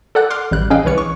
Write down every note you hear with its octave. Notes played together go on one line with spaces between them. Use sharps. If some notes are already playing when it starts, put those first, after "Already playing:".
A4 D5 F#5 F#6
C6 D6 F6
A1 G3 F#6
C#4 G#4 D#5 F5 G5
C2 E3 B4 C#5 C#7
C#6